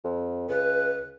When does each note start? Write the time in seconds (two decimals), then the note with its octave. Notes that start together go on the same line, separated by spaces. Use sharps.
0.05 F2
0.49 C#2 B4